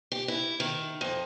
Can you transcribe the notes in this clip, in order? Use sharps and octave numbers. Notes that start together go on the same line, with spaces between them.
G4
E4
D#3
F2